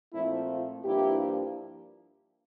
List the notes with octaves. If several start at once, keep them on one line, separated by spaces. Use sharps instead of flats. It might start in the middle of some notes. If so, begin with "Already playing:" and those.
A#2 F3 A3 C4 E4
F4
G2 F3 A#3 D4 E4 G4